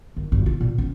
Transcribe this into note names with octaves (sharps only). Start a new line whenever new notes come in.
D#3
G2
F4
A#2
C#4